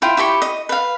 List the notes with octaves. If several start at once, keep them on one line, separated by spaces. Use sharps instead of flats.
E4 F4 G5
E4 G4 B5 C#6
D#5
B4 F5